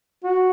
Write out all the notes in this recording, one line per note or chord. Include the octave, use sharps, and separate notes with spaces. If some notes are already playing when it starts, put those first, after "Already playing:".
F#4